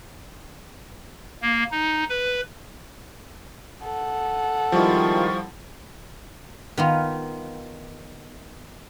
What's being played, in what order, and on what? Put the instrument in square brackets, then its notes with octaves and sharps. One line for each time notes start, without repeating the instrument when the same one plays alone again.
[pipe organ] A#3
D#4
B4
[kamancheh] A4 F#5
[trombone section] D#3 G#3 C4 [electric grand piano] F3 G3 E4 [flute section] F4 C#6
[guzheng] D#3 B3 F4